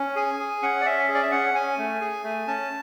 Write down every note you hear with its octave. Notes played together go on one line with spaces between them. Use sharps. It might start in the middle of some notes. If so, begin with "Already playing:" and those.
Already playing: C#4
G#4 G#5
G#4
C#4 F#5
D5
C#4 E5
G#4
D5
E5
C#4 F#5
C#4 G#5
A3
G#4
A3
C#4 A5